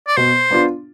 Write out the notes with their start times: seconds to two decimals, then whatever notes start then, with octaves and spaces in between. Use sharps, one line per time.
0.08 D5
0.17 B2 C5
0.51 B3 D4 F4